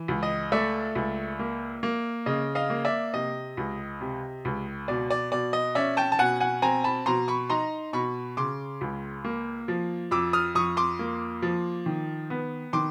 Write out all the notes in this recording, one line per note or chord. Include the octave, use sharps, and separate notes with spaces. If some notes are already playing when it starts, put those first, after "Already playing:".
Already playing: E3
C#2
D#5
A3 D5 E5
C#2
A#3
A#3
C#3 D#5
D#5 F5
A#3
D5 E5
C3 D#5
C#2
C3
C#2
B2 D5
D5
B2 D5
D#5
C#4 D5 E5
G5 A5
A5
B2 F#5 G#5
F#5 G#5
C4 G#5 A#5
A5 B5
B2 A#5 C6
B5 C#6
D#4 A#5 C6
B2 B5 C#6
C#3 C6 D6
C#2
A#3
F3
F2 D6 E6
D#6 F6
F2 C#6 D#6
C6 D6
A#3
F3
D#3
B3
D#3 C6 D6